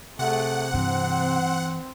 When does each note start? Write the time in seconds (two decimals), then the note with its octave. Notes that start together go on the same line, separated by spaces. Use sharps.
0.19 C3 A3 G#4 F#5
0.74 G2 E3 C4